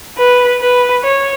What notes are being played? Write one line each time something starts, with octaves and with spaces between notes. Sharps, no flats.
B4
B4
C#5